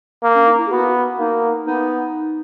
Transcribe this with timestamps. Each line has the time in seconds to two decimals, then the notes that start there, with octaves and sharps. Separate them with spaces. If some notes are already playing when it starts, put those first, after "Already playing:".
0.23 A#3
0.35 C#4
0.47 D#4
0.58 E4
0.67 G#4
0.71 B3 F#4
1.18 A#3 D#4
1.66 B3 D#4